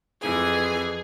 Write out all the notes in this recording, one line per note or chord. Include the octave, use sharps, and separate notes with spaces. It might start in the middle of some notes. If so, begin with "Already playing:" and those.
F2 E3 G#4 G#5